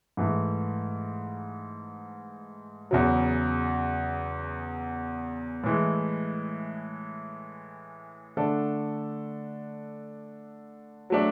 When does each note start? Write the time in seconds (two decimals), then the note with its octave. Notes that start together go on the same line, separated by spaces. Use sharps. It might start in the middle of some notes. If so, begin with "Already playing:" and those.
0.17 G#2 E3 A3
2.91 E2 C#3 F#3
5.64 A2 E3 G#3
8.37 D3 A3 D4 A4
11.10 F#3 A3 D4